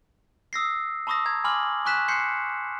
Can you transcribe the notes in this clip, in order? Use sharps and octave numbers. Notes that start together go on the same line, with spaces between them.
D#6 E6 A#6 C7
A5 B5 C#6 D#6 E6 A#6
A5 A#5 G#6
G#5 B5 C6 D6 F6 F#7
G#5 C#6 F#6 B6 E7
C6 F#6 G6 C7 C#7